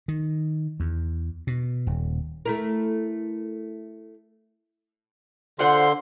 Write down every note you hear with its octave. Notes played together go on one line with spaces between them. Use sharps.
D#3
E2
B2
D#1
A3 E4 A#4
D3 F4 C5 F#5 C6